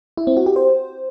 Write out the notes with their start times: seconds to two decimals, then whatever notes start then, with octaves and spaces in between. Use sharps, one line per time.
0.17 E4
0.27 C4
0.37 F#4
0.46 G4
0.56 C5